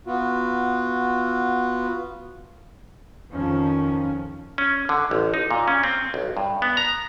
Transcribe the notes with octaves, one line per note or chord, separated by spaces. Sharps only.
B3 F4 F#4
F2 D#3 F3 C#4
C#4
D3
A1
D#4
A#2
C#4
C4
B1
G2
B3
A#5